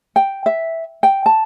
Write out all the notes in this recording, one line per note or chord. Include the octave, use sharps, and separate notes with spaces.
G5
E5
G5
A5